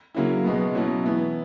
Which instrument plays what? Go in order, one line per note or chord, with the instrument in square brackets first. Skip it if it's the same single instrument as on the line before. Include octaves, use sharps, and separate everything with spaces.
[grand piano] C#3 F#3 A#3 C#4 E4
B2 G#3 B3
B2 F#3 C#4 E4
E3 B3 E4